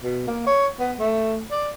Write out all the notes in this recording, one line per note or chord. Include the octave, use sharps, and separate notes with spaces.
B2
A#3
C#5
B3
A3
D5